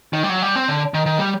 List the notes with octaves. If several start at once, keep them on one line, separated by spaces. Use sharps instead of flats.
D#3
G3
F#3
G3
C4
D3
D#3
D#3
G3